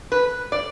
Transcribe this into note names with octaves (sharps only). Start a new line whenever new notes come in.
B4
D5